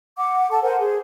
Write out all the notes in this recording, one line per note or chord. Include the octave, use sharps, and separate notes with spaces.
F#5 D6
A4 F#5 A5
A#4 C5 F#5 G#5
G#4 C5